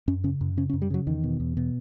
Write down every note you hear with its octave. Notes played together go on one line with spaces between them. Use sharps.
F#2 C#4
C#3 C#4
F#2
C#3 C#4
C#4
F#2
G3
C#3 F#3
E2 D#3
B2
E2
B2